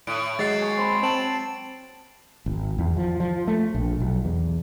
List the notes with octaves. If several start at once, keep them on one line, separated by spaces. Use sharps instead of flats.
A2 D7
F#3 G#3 A6 C7
G#5 C#6
C4 C5 B5
C4 A5 D7 E7 F#7
G#1
E2
F3
F3
A3
A#1
B1
E2